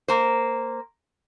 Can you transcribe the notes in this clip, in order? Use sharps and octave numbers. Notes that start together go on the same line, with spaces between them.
A#3 C5